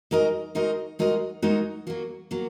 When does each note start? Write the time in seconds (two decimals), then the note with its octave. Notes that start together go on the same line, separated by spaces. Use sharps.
0.11 G#3 D#4 F#4 A#4 D#5
0.55 G#3 D#4 F#4 A#4 D#5
0.99 G#3 D#4 F#4 A#4 D#5
1.42 G#3 D#4 F#4 A#4 D#5
1.87 F#3 A#3 F#4
2.31 F#3 A#3 F#4